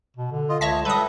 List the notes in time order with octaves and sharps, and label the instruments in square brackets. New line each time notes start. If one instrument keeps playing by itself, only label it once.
[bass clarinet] B2
D3
[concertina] F4 D#5
[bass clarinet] C#2 [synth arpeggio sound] C#5 E5 A#6 [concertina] A5
[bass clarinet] G3 [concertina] A4 E5 [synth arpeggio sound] B4 D#6